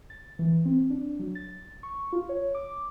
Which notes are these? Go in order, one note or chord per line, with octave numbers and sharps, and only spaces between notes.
A6
E3
C4
D4
F#3
A6
C#6
F4
C#5
D6